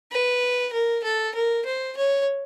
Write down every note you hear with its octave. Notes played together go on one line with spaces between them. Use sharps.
B4
A#4
A4
A#4
C5
C#5